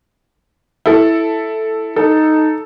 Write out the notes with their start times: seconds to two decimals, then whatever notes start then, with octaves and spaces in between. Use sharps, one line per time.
0.86 E4 A4
1.96 D#4 A4